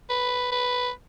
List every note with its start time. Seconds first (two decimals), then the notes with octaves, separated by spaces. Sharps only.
0.09 B4
0.52 B4